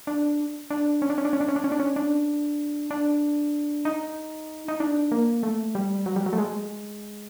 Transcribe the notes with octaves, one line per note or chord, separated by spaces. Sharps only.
D4
D4
C#4
D4
C#4
D4
C#4
D4
C#4
D4
C#4
D4
C#4
D4
D4
D#4
D#4
D4
A#3
A3
G3
F#3
G3
F#3
A3
G#3